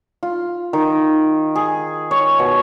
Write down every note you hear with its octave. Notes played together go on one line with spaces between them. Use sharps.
F4
D#3
G#4
C#5
B2